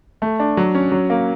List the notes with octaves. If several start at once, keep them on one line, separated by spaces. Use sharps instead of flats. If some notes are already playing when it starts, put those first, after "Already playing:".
A3
D4
F#3
C#4
F#3
A#3